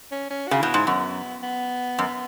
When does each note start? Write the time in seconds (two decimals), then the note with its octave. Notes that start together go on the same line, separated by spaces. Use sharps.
0.12 C#4
0.30 C#4
0.48 C#3 F#4
0.58 B2 E4
0.74 G#2
0.87 F#2 B3
1.43 B3
1.98 F#2